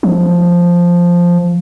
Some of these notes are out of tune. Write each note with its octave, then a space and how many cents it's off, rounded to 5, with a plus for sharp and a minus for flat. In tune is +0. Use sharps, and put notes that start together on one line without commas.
F3 +0